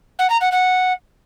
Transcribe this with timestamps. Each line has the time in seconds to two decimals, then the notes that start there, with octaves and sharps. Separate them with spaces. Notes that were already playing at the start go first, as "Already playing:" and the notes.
0.19 F#5
0.30 A#5
0.41 F#5
0.52 F#5